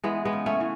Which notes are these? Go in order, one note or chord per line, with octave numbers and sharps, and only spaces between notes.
E3 G#3 B3
G#3 B3
C#3
A3 C#4
E3